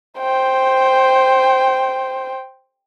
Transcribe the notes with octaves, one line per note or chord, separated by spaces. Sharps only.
C5 G5